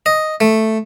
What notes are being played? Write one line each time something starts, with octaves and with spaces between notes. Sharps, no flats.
D#5
A3